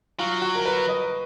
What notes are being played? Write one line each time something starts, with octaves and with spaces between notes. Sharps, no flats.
F#3 F4
F#4
A#4
B4
D#5